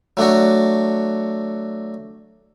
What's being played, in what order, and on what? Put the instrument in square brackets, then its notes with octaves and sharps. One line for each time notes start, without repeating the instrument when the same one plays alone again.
[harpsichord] F#3 A3 D4 F#4